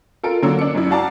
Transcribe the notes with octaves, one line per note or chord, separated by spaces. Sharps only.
F4 A4 A#4 D7
D3 F#3 A#3 A4 E6
D4 C#7
F#2 E4
F#4 D5 F5 A5 A#5 D6